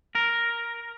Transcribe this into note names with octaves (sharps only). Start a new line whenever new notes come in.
A#4